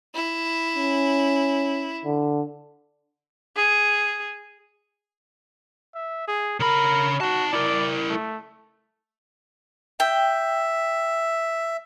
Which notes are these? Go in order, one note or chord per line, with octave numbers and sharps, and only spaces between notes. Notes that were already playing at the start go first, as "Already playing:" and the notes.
E4
C#4
D3
G#4
E5
G#4
C#3 A#4 B5
D#4 F#4 A5
E4 A#4 D5
A3
E5 G5